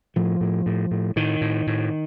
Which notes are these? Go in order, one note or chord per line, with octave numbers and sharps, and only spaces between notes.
A2 F3
A2
A2
A2
A2 D#3
A2
A2